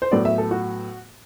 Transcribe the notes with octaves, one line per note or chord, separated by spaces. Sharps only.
C5
A2 F#3 B3 D5
E5
A4
F#4